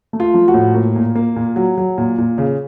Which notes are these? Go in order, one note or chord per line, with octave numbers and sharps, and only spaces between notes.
A3
F4
F3
F#4
A2
A#3
A#2
A#3
A#2
F#3
F#3
A#2
A#2
C#3